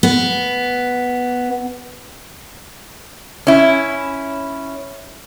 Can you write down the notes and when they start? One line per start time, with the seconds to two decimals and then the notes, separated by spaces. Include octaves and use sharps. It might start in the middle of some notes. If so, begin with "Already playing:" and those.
0.03 B3
3.47 C#4 E4